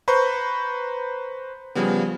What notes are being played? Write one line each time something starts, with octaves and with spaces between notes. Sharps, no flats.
B4 C5 A#5 B5 C#6 G6
C#3 F3 G3 B3